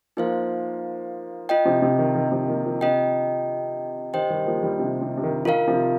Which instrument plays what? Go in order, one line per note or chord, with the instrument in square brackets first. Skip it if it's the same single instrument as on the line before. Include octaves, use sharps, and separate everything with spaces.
[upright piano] F3 A#3 [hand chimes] D#4 C5 F5
[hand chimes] F4 D#5 G5
[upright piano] C3 F3
C3 F3
D#3
D#3
C3 F3
F3 A#3
F3 A#3
[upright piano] C3 [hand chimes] F4 D#5 G5
[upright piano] D#3 [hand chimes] G4 C5 D#5 G5
[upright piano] D#3 G3
F3 A#3
D#3 G3
C3 F3
C3
C3
D#3
[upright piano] D#3 [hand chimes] F4 A#4 F5
[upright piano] C3 F3